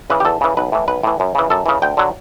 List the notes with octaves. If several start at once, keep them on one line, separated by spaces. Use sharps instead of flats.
C#3 E3 B4
G4
E2 A4
C#3 E3
B1 B4
A2 E3
B1 B4
A2 E3
F#2
C#3 E3
F#2 A4
C#3 E3
D2 G5
D3 F#3